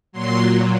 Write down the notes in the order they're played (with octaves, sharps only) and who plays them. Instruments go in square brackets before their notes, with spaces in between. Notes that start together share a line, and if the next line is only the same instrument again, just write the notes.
[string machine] A#2 F#3 C6